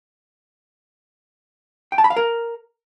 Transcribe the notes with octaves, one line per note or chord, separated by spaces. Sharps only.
G5
A5
B5
F5
A#4